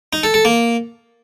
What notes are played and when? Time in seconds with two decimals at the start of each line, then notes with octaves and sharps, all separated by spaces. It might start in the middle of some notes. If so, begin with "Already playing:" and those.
0.13 D#4
0.23 A4
0.34 A4
0.45 A#3